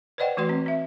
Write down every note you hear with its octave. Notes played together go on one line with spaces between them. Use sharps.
B4 C5 D5 D#5 F#5 G5
E3 A3 F#4 B4 C6
C4
C4 E5